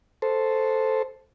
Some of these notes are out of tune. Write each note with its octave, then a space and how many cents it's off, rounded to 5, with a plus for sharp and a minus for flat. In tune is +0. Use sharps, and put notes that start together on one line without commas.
A4 +0 C5 +0